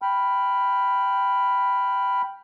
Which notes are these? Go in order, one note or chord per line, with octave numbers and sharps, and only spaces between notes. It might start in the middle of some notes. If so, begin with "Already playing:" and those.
G5 B5 F6